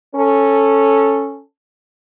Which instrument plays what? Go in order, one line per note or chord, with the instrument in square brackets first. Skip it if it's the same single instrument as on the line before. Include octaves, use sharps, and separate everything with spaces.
[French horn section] C#4 A4